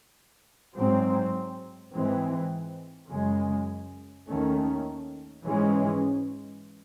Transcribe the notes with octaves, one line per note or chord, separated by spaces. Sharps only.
G#2 F#3 C4
G#2 E3 G#3 C4
F#2 C#3 G#3
D#2 D#3 A3 C#4
G#2 E3 G#3 C#4